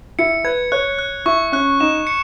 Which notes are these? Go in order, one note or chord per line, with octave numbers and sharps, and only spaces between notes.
E4 C#7
B4 G#6
C#5 F#6
F#6
E4 C#6
C#4 F#6
D#4 E7
C#7